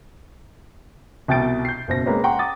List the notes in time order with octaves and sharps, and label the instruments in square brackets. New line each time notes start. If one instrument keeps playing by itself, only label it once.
[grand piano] C2 B2 G5 G6 A6 D7
G6 C7
F#1 B2 C5 A#6
G#3 A#3 C4 B4 C#5
F#5 G5 A#5 C6 C#6
D6 D#6 A6